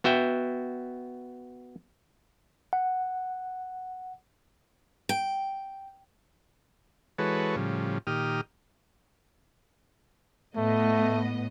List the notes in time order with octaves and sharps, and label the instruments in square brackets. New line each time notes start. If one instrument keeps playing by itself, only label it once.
[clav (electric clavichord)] B3 F#4 E5 G5
[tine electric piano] F#5
[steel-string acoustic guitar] G5
[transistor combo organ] E3 G#3 F#4 A4 B4 C#5
A2 C#3 F3 G3
A#2 D#3 G4 D#6 F6
[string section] A2 B3 D#5 [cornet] A3